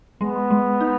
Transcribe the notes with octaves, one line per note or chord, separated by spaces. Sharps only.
G#3 B3
G#3
D#4